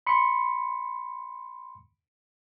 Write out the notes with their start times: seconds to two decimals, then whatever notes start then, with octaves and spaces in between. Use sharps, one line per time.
0.07 B5 C6 C#7